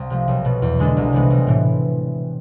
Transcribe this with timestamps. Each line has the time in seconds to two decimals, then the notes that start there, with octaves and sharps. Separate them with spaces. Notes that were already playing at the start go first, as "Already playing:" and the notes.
Already playing: C2 C4
0.10 C3 F3 A3
0.28 B1
0.45 B2 B3
0.62 E2
0.79 D3 G#3 D4 A4
0.97 C2
1.13 C3 E3 G#3 B3
1.30 B1
1.47 A2 E3